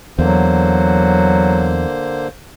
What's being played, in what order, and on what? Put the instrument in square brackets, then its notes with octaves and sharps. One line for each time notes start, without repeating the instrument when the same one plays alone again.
[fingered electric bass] E2 [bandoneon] D3 A#3 C5 [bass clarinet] F#3